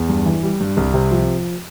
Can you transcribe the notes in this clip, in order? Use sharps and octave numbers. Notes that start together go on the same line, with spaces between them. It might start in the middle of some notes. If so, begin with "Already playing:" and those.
Already playing: E2
G2
E3
G3
G2
C2
C3
F3